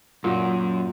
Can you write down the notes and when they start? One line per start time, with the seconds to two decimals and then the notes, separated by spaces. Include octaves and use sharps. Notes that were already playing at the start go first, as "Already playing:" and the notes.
0.24 F#2 A#2 F#4